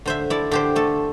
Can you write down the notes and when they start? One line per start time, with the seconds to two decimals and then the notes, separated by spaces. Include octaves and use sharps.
0.06 D3 C5 E5
0.30 E4 A4 D5
0.51 D3 G4 C5
0.76 A3 A4